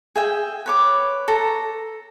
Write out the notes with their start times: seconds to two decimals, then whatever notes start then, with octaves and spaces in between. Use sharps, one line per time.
0.15 G#4 E5 G5
0.66 B4 C#5 D6
1.28 A4 A#5